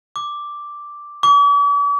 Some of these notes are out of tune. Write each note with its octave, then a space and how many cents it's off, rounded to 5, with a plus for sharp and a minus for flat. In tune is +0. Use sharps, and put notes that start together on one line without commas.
D6 +0
D6 -45